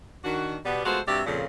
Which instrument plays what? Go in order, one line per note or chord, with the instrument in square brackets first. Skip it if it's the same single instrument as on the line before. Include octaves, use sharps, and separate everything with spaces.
[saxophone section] D#3 D4 F#4
B2 G3 B3
G#3 A3 B3 F4 F#4 C5
G2 C3 F#4 G4 D5 E5
F2 A#2 C#3